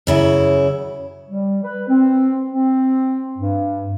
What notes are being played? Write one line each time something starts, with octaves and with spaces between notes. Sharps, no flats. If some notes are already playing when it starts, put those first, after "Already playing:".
F#2 C#3 E4
G3
B4
C4
C4
G2